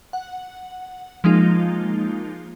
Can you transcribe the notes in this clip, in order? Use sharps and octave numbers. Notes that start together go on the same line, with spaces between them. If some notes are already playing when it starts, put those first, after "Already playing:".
F#5
F3 G#3 A#3 D#4 F4